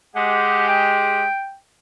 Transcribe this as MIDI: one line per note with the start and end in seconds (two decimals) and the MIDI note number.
0.16 1.24 56
0.16 1.24 67
0.16 0.65 78
0.69 1.55 79